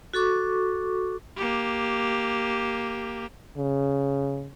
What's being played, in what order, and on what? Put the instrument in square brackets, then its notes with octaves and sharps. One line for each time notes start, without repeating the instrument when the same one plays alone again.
[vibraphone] F#4 A4 C#6 D6
[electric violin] A#3 G4
[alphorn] C#3